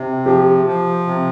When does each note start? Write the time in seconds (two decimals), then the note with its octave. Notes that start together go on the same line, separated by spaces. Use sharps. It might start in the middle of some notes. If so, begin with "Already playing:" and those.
Already playing: C3
0.26 F3 G4
0.66 F3
1.07 C3